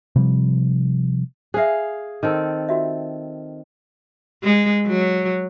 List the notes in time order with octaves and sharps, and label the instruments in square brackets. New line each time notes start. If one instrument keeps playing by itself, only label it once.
[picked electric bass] C3 F3 G3
[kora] G#4 F5 [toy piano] C5 E5
[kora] D#3 C4 A4
[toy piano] F4 F#4 E5
[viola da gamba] G#3
F#3